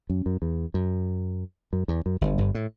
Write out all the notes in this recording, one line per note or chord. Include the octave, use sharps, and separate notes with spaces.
F#2
F#2
E2
F#2
F#2
E2
F#2
G1 G2
G1 G2
A2